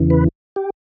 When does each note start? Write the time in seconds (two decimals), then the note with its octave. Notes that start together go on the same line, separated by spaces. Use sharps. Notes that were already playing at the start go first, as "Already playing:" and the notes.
Already playing: E2 C#3 E3
0.10 B4
0.56 G4